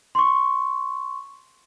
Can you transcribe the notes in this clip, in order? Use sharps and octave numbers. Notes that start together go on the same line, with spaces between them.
C6 C#6